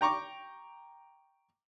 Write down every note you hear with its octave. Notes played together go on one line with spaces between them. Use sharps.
G5 A#5 C#6 D6